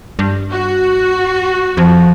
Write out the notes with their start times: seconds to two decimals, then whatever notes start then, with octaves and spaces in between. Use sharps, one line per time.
0.19 G2
0.52 F#4
1.77 F2 F3